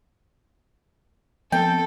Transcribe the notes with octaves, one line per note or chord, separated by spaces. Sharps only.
F3 B3 C4 A4 G5